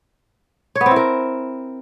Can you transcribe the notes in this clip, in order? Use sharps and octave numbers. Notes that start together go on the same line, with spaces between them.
C#5
B3
C4
E4
A#4